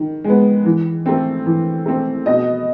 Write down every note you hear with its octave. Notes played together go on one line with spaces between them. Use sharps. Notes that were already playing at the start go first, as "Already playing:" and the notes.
Already playing: D#3
G#3 B3
E3
A3 C4
E3
A3 C4
B2 D#5